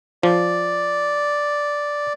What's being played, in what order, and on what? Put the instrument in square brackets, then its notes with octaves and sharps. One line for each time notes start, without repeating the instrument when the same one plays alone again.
[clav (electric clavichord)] F3 [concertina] D5